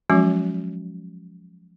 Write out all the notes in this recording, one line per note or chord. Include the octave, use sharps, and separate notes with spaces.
F3 F#3 G#3 C#4 F#4